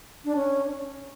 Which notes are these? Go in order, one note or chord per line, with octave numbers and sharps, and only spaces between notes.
D4
C#4